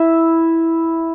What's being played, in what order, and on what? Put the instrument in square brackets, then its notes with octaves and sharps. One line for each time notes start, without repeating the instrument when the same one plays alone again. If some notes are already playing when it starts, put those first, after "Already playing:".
Already playing: [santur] E4 E5